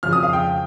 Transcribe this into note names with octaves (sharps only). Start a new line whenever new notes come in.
F2 C#3 F3 F6
D#6
F5
G5